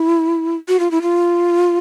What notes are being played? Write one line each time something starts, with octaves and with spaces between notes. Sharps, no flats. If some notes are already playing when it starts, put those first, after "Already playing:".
Already playing: E4
F#4
F4
E4
F4